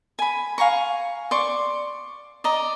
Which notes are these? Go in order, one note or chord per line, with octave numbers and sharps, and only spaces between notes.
G#5 B5
F5 G#5 A#5 C#6
D5 C6 C#6
D5 D#5 A#5